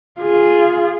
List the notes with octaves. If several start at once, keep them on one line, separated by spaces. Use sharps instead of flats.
F4 G#4